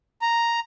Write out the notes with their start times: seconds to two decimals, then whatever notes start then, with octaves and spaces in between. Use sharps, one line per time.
0.22 A#5